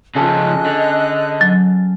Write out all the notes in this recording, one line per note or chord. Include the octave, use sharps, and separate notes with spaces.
C#3 F3 C#4 G#4 A4 D#5 F#6
D3
F#3